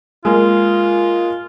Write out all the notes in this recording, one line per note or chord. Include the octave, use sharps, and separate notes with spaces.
G#3 A#3 F4